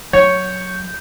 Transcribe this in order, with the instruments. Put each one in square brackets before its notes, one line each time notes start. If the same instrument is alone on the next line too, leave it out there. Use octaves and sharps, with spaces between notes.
[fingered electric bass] F#3 [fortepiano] C#5 [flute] G6